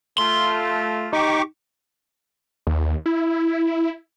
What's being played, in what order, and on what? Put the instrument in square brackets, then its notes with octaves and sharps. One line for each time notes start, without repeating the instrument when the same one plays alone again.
[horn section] A3 F4 [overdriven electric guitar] C6
[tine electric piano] D#4 [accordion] G4 C#6 D6
[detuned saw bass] D#2
E4